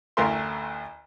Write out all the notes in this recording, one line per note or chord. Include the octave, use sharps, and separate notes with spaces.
A1 D2 A3 A#4 E5 C6